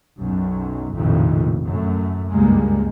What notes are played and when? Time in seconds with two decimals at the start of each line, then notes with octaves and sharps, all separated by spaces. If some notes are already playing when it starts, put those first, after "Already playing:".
0.21 B1 F#2
0.97 A#1 F2 A2 C3 D#3
1.67 F#2 A3
2.32 C#2 G2 G3 G#3 A#3